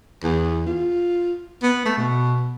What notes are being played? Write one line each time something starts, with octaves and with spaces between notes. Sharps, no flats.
E2
F4
B3
A3
B2